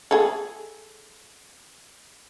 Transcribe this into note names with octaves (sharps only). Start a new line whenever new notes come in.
G#4 A4